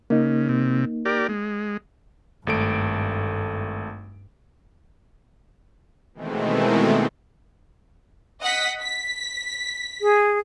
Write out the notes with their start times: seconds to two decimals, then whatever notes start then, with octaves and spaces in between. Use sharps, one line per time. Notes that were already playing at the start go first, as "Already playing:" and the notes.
0.10 C#3 A#3 D#4
0.49 C3
1.05 G4 A#4 D5
1.29 G#3
2.47 G#1 G2 A3 D7
6.14 B2 D#3 E3 G#3 A3 C4
8.42 D#5 F#5 B6
8.82 B6
10.01 G#4